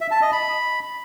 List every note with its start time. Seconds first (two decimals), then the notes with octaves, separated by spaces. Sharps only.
0.01 E5
0.11 A5
0.22 D#5
0.32 B5